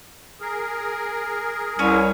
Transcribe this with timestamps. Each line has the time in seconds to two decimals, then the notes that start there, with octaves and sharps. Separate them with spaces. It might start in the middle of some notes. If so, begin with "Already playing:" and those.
0.41 G#4 A#4
1.79 C2 C#4 B4 C#5